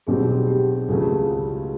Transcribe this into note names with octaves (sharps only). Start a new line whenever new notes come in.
B1 B2 G3 C4 G#4
G4
C#2 C#3 F#3 A3 F4